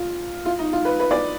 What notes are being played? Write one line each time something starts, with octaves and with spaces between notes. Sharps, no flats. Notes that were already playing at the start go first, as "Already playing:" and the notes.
Already playing: F4
F4
D#4
F4
B4
B4
D5